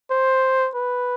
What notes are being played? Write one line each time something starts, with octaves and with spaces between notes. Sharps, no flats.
C5
B4